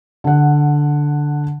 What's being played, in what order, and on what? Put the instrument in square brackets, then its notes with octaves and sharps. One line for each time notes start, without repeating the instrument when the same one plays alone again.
[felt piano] D3 F#5